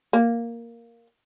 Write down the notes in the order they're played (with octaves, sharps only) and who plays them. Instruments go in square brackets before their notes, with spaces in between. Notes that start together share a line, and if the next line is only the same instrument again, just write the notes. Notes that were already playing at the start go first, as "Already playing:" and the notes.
[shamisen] A#3